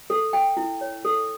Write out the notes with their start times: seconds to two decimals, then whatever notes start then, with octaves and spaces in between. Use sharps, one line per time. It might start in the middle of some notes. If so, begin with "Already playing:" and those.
0.10 A4
0.33 G5
0.57 E4
0.81 C#5
1.05 A4